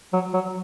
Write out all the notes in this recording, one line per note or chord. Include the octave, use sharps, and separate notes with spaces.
F#3
F#3